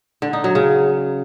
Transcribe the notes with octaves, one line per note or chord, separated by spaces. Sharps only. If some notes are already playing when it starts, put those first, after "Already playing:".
D3
D#4
F#3
C#3